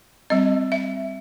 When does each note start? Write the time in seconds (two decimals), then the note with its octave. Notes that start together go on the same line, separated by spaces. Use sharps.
0.30 G3 C4 D#5
0.72 E5